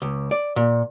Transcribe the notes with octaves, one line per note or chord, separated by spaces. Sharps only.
C#2
D5
A#2